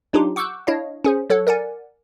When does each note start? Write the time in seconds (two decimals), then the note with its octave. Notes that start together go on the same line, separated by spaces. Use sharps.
0.13 F#3 D4 D#4 F4 G4
0.36 F#5 C#6 D6 E6 F#6 G6
0.67 D4 E4 C#5 D#5 F5
1.04 C#4 G#4 C5
1.30 F#3 A4 C#5 F#5
1.47 A#4 D5 F#5 G#5